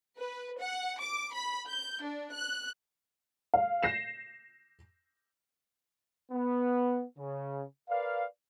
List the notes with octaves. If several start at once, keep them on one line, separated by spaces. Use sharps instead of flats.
B4
F#5
D6
B5
G6
D4
F#6
F5
G6 A#6 C7 E7
B3
C#3
A#4 B4 D5 F5